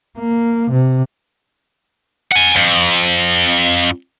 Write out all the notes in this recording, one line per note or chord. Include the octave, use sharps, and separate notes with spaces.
A#3
C3
F#5 G#5
F2